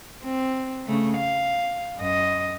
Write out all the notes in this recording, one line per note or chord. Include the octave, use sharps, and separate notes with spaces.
C4
C#3 A3
F5
F#2 D#5